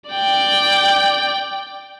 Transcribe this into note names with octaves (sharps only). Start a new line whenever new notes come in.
D5 G5